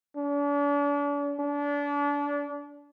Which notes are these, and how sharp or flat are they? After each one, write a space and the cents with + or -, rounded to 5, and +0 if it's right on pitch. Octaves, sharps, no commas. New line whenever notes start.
D4 -40
D4 -30